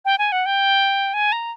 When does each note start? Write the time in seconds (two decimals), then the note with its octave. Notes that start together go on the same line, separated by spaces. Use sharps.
0.05 G5
0.18 G#5
0.32 F#5
0.46 G5
1.14 G#5
1.32 A#5